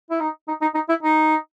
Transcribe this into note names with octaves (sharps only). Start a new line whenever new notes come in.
E4
D#4
D#4
D#4
D#4
E4
D#4